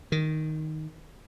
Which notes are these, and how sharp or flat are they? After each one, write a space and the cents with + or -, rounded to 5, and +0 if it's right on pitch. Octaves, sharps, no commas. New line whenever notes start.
D#3 +0